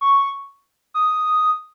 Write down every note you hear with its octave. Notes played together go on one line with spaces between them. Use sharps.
C#6
D#6